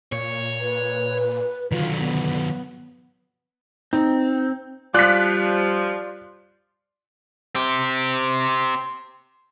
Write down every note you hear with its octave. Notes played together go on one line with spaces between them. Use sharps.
A#2 C#5
B4
D3 D#3 F#3 F4
B3
C4 D#4
F3 G3 F4 D5 D6 F#6 B6
C4 G4